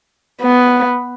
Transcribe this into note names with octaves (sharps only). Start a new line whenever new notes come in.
B3